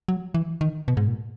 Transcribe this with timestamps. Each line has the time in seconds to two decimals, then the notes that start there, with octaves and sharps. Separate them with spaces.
0.08 F#3
0.34 E3
0.61 D#3
0.88 B2
0.97 G#2
1.08 A#2